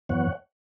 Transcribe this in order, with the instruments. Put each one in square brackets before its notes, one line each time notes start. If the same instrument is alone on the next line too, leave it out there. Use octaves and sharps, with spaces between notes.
[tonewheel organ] F#2 E3 B3 C#5 F#5